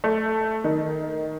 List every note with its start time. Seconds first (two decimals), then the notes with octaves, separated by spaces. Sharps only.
0.04 A3
0.64 D#3